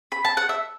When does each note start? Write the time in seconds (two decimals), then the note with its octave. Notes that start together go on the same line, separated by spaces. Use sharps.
0.12 B5
0.25 A5
0.37 F#5
0.49 E5